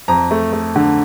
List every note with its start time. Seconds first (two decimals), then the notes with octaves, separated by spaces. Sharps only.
0.08 F2 A#5
0.31 A3
0.53 A3
0.76 D3